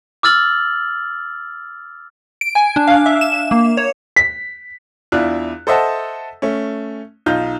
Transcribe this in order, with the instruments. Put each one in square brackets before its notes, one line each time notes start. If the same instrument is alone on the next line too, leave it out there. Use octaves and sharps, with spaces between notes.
[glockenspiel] D6 E6 F6 A6 F#7
[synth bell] D7
G#5
D4
F5
E5
E7
A#3
C#5
[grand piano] B6
[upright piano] E2 D4 E4 F4 F#6
A4 C5 D#5 E5 F#5 A5
A3 C#4
B1 D#4 F4 G6